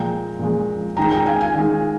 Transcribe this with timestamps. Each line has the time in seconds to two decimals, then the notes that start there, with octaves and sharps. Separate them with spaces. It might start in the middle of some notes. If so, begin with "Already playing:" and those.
Already playing: A#2 F3 G#3 G5 A#5
0.39 A#2 F3 G#3
0.97 D#3 G#3 G5 A#5
1.11 G5 A#5
1.26 F5 G#5
1.40 F5 G#5
1.55 D#3 G#3